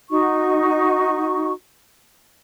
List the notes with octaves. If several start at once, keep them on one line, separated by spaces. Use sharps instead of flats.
D#4 F#4 C#6